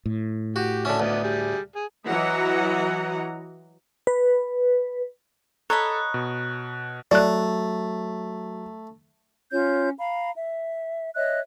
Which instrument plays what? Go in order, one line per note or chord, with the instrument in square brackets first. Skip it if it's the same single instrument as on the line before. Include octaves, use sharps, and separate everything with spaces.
[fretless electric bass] A2
[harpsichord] F#4 [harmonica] G4
[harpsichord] D3 C#4 [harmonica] F#4 D5 E5
[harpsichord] D2 [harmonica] B3 D5 D#5
[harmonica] G3 G#4
G#4
[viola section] E3 F#3 F#4 D#5 F#5 A#5
[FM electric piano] B4
[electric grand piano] A4 [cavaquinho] C#5 D#5 B5 [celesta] A#5 [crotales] F#6
[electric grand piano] B2
[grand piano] F#3 [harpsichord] A3 [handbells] D5 F#6
[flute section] C#4 F4 C#5 G6
F5 A#5 B5
E5
C#5 D#5 E5 F#6